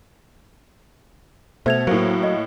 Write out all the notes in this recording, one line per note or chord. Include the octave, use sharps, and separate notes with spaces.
B2 A3 C5 G#6 F7
A2 F#3 A#3
D#5